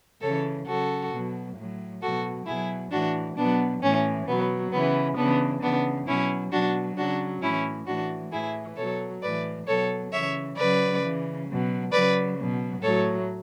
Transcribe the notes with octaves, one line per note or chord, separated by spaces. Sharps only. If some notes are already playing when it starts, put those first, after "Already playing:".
C#3 E3 A4 C#5
C#3 F#3 F#4 A4
B2 F#3
A2 F#3
B2 F#3 F#4 A4
B2 F#3 E4 G#4
A2 E3 D4 F#4
B2 F#3 B3 D4
A2 E3 C#4
B2 F#3 B3
C#3 E3 B3
C#3 E3 B3 D4
C#3 E3 B3 D4
B2 F#3 C#4 E4
B2 F#3 D4 F#4
C#3 F#3 D4 F#4
A2 E3 C#4 E4
A2 E3 D4 F#4
A2 E3 E4 G#4
B2 F#3 A4 C#5
A2 E3 B4 D5
B2 F#3 A4 C#5
C#3 E3 C#5 E5
C#3 F#3 B4 D5
C#3 E3
B2 F#3
C#3 F#3 B4 D5
B2 F#3
A2 F#3 A4 C#5